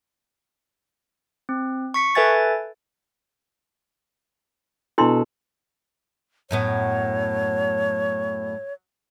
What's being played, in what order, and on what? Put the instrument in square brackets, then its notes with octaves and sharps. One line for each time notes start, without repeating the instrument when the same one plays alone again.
[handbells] C4
C#6 B6 C#7
A4 B4 E5 G#5 G#6 A6
[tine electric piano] B2 A4 [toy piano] D4 E4 C6
[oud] F#2 A2 B3 [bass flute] C#5